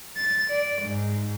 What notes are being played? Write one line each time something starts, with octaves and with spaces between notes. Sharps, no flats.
A6
D5
G#2